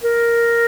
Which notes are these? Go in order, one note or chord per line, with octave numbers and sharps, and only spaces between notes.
A#4